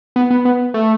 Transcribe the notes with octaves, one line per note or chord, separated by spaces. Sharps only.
B3
B3
B3
A3